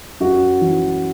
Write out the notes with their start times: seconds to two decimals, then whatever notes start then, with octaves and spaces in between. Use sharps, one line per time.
0.20 F#2 F#4
0.61 E3